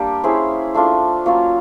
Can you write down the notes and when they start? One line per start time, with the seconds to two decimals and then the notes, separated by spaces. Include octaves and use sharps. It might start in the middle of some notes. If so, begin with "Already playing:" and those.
Already playing: G3 A#3 D4 G4
0.23 C#4 E4 G#4 C5
0.74 A3 D4 F4
1.26 F#3 A#3 C#4 F4